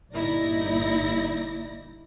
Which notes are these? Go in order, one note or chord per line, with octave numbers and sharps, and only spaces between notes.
G1 A#2 D#4 E4 D5 A#6